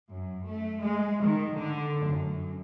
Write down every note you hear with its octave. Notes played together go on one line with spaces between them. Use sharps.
F#2
A3
G#3
D#3
D3
F#2